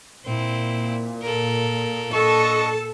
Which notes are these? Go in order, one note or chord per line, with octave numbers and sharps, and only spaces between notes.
A#2 C4 E4
A4 A#4
D4 A4 D#5 A5 C#6